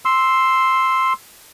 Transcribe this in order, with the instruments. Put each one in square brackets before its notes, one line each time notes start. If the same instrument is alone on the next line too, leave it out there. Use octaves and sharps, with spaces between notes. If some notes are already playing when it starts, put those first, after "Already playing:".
[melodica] C6 E6